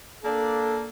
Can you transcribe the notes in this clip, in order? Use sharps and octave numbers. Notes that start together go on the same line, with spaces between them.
A#3 D4 A4